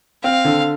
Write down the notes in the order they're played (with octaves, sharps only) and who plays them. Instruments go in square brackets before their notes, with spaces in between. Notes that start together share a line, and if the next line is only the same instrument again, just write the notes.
[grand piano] C4 [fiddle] F5
[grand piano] D3